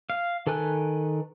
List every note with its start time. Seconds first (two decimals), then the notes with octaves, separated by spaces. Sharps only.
0.10 F5
0.47 D#3 A4 B4 G#5 F#6